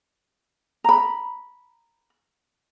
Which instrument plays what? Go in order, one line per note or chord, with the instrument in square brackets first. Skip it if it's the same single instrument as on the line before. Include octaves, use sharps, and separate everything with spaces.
[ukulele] A#5 B5